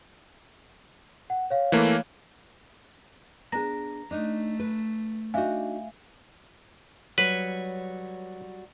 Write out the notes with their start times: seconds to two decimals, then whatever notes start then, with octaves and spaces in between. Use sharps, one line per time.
1.30 F#5
1.50 C#5 F5
1.72 E3 A3 A#3
3.52 B3 D4 G#4 A#5 A#6
4.11 A3 D4 D#4
4.60 B4
5.34 D4 D#4 F#4 E5 F5 G#5
7.18 F#3 G3 B4 C#5